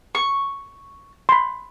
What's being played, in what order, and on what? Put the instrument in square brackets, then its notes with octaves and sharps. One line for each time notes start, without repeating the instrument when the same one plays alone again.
[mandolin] C#6
[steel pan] B5 C6